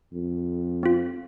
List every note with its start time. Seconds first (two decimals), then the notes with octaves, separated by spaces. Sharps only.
0.14 F2
0.83 C4 F4